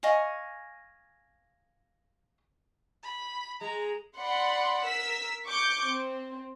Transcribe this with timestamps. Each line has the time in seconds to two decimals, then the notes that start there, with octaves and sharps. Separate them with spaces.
0.03 D#5 F5 G#5 C#6
3.03 B5
3.61 G#3 A#5
4.19 D5 F#5 B5 C6
4.84 A#4 E6 B6
5.47 C#6 D6 G6
5.87 C4